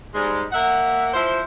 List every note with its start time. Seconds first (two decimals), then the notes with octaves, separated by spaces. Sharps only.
0.15 G#2 G3 G#3
0.53 A#3 E5 F#5
1.14 F3 E4 C5